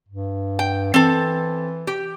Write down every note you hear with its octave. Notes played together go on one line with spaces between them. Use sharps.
G2
G5
E3 C4 A4
G4